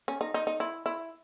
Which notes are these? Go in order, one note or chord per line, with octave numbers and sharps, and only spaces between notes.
C#4
D#4
D#4
D#4
E4
E4